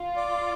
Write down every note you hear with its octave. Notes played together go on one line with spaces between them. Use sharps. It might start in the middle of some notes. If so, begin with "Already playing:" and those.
Already playing: F4
D5